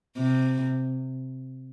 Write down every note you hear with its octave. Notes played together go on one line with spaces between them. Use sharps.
C3